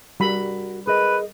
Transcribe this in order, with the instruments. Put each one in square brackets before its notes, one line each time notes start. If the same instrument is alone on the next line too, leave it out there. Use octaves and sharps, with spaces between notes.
[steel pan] G3 B5 [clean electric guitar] F#4 A#4
[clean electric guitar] G#4 A#4 D#5 [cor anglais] B4